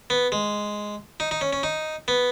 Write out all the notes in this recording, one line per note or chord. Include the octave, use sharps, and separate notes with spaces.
B3
G#3
D#4
D#4
C#4
C#4
D#4
B3